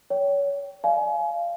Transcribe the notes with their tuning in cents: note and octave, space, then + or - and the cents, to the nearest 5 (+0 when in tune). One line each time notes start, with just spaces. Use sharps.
C#5 +25 G5 -15
D5 +35 F5 -20 G#5 +30